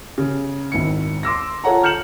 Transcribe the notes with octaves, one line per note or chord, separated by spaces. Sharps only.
C#3
G#1 E4 C#7
C6 D6 E6 A#6
F4 A4 C#5 F#5 A#5
F6 G6 C#7 E7 F#7